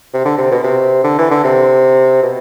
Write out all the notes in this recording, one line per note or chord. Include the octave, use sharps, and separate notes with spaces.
C3
D3
C3
B2
C3
D3
E3
D3
C3
B2